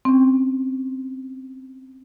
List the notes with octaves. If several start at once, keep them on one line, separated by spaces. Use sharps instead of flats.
C4 C#4